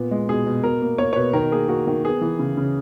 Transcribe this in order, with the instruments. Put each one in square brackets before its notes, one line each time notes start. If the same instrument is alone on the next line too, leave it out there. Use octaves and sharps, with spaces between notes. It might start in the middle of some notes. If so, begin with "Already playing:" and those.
Already playing: [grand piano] A#2 B3
G#3
B2 G#4
B2
B2 A#4
A#3
A#3 C#5
C#5
B2 B4
D#3 A#4
A#3 G#4
A#3 F#4
D#3
B3 G#4
E3
C#3
C#3